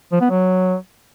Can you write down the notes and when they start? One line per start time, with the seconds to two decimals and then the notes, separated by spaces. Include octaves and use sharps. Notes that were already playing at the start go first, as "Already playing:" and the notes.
0.12 F3
0.21 B3
0.30 F#3